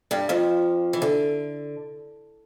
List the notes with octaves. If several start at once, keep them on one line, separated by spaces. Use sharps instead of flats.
G2 G3
F2 F3
E3
D3